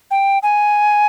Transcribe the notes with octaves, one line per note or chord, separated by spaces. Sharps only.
G5
G#5